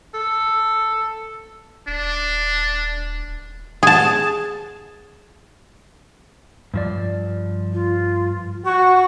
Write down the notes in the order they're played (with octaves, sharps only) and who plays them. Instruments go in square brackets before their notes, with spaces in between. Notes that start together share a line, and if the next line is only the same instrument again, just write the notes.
[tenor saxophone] A4
[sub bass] D#1 [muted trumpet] D4
[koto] G#4 A5
[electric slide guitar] G2 F3 D5
[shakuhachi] F4
[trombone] F#4 [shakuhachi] C#6